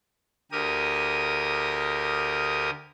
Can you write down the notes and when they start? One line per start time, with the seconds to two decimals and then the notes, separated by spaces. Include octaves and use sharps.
0.52 D2 G4 A#4 D#6